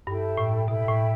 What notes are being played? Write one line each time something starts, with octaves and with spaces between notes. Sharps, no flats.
G2 E4 A4 G5 B5
A2
B2 E4 A4 G5 B5
A2